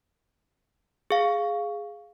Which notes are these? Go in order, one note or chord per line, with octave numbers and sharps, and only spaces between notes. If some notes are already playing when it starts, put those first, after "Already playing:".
G#4 F5